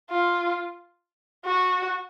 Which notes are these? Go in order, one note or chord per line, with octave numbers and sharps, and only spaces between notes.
F4
F#4